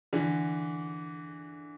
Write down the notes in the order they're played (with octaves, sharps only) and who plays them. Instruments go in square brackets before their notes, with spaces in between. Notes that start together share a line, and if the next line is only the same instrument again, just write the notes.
[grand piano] D3 E3